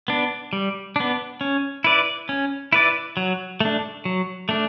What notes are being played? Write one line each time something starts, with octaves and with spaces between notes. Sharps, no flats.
B3 D4
G3
B3 D4
C#4
E4 B4 D5
C#4
E4 B4 D5
F#3
A3 D4
F#3
A3 D4